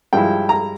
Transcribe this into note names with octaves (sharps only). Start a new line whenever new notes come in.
G2 F3 G#3 E4 G5
A#5